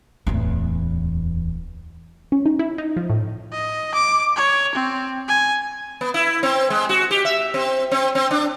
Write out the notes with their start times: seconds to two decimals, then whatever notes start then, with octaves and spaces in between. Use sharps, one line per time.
0.27 D1 E2
2.32 C#4
2.46 D#4
2.59 E4
2.78 D#4
2.96 F3
3.10 A2
3.52 D#5
3.94 D6
4.36 C#5
4.75 C4
5.28 G#5
6.01 B3
6.14 E4
6.43 C4
6.70 G#3
6.89 F#4
7.11 G4
7.25 E5
7.54 C4
7.91 C4
8.15 C4
8.31 D4